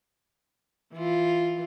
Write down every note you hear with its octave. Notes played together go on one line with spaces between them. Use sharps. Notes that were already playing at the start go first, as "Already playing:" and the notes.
E3 F4